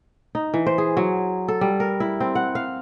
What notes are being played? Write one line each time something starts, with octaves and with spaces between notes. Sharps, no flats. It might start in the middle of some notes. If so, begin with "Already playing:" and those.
D#4
E3
C5
G#4
F#3
A4
G3
A#4
E4
C4
F#5
F5